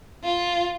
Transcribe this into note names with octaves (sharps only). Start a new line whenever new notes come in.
F4